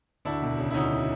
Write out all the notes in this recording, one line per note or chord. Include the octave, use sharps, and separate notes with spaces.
D2 D4 E4
E1
C#3
E4
D2 C#4 D#4
E3